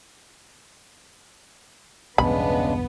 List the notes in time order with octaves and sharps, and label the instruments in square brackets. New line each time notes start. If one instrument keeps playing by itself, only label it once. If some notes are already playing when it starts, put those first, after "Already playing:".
[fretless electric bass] B1 E2 G2 [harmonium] C#3 G#3 D4 [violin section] B3 [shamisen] B5